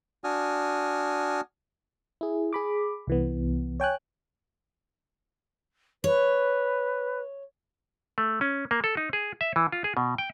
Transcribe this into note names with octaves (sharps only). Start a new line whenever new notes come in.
D4 F#4 G#5 D#6 F6
E4 G#4
G#4 B5 D6
C2 E3 B3
C#5 G5 G#5 F#6
B4 C#5
A3
C#4
A#3
A4
D#4
G#4
E5
E3
F4
G#4
B2
G5